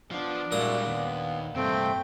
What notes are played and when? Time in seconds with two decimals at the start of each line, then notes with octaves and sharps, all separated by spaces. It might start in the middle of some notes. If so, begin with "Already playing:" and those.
0.11 F3 B3 D4
0.52 A#2 G3 G#3 E4 F#4 D#6
0.87 D#2 B3
1.56 G2 C3 A3 C4 G5